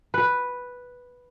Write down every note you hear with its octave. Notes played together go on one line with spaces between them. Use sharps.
B4